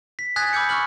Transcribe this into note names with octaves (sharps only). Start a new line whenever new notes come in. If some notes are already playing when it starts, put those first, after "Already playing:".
B6
G#5 D#6 F#6 G#6 A6 B6
B5 D6 E6 G6 C#7
C#6 F6 F#7